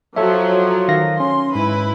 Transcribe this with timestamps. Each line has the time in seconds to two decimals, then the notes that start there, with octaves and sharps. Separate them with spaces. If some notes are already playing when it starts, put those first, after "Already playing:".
0.16 F3 F#3 A4 C#5 E5
0.88 D#3 F5 A#6
1.20 C#4 C6
1.55 G#2 E4 B4